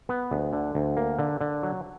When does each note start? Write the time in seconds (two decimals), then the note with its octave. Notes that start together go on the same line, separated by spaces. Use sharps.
0.09 B3
0.31 D2
0.53 D3
0.75 D2
0.97 A#3
1.19 D3
1.41 D3
1.63 F#3